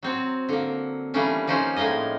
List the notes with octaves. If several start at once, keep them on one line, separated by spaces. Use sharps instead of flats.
F#3 C4 F#4
D3 A#3
E3 G3 A3 A#3 C#4 D4
F3 A#3 C#4 D#4 C5
A2 G#3 A#3 D#5